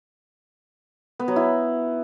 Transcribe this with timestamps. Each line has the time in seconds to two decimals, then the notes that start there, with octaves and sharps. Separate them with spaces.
1.19 B3
1.28 F#3
1.36 E4